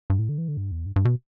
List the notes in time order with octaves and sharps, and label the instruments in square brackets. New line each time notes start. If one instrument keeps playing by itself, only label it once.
[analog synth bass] G2
A2
D3
E3
D3
G2
E2
G2
G2
B2